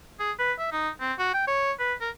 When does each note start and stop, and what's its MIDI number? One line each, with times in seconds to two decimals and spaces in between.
0.19 0.31 68
0.39 0.53 71
0.59 0.68 76
0.72 0.89 63
1.00 1.13 60
1.19 1.31 66
1.34 1.43 79
1.47 1.72 73
1.79 1.94 71
2.01 2.10 70